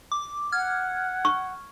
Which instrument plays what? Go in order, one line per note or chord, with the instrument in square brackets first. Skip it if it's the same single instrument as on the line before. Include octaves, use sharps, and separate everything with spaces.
[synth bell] D6
[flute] F#5 [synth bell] F6 G#6
[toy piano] C#6